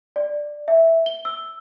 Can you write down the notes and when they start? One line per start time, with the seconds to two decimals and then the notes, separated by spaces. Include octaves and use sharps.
0.16 D5
0.68 E5
1.06 G7
1.25 E6